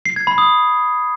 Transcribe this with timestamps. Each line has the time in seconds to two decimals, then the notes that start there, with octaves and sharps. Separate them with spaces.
0.06 C7
0.16 G#6
0.27 B5
0.38 D#6